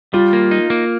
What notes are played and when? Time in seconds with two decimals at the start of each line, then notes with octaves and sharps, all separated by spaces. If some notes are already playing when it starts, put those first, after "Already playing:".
0.14 G3 F4
0.33 A#3
0.51 D#4
0.70 A#3